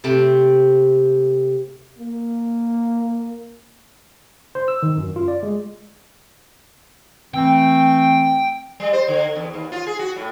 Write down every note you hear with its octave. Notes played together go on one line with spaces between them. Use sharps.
C3 A3 C4
A#3
C5
E6
D#3
F#2
F4
D5
G#3
E3 A3 C4 G5
G3
C5
D3
E2
D#2
F4
G#4
F#4
A2